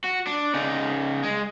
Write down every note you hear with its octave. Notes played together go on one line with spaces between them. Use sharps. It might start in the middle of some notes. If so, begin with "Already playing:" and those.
F#4
D4
C#3 D#4
G#3